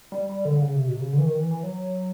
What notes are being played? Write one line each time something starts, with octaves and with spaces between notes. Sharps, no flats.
G3
G3
D3
D3
C#3
C3
B2
C3
C#3
D3
E3
D#3
E3
E3
F#3